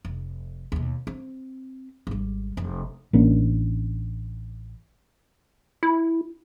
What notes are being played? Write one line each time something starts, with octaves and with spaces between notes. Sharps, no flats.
F1
D#2 B2
C4
G#1 G3
F1
A1 A#3 C#4 D4
E4